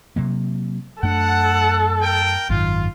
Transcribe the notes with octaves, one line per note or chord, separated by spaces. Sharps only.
C3 F#3 A#3
F#2 A3 D4 A4 F#5
A#4 G5
G#1 F#2 D#3 F4